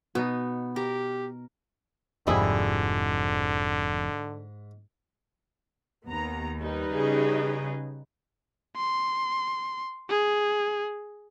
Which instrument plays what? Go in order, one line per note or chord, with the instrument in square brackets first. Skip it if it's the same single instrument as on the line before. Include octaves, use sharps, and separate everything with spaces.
[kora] B2 D#4 [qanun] B3
[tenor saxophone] G4 [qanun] A#4
[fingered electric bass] F1 F2 F3 [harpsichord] G#2 [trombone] D3 [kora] G3 E4 G#4
[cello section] D#2 [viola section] B3 A#5
[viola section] G3 D#4 B4
[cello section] C#3 G#4
[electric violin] C6
G#4